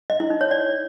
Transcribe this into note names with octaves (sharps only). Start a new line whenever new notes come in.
D#5
E4
D#4
C#5
D5